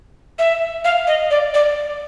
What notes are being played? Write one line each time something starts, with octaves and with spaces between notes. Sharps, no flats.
E5
F5
D#5
D5
D5